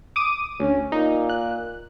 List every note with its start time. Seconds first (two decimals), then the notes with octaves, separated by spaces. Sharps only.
0.16 D6 D#6 D#7
0.60 D2 C#4
0.92 A#2 D#4
1.29 F#6